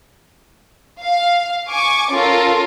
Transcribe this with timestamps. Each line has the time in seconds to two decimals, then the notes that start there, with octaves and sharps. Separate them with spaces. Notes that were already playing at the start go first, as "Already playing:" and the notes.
1.02 F5
1.70 G#5 C#6 D6
2.11 C#4 F4 A4 A#4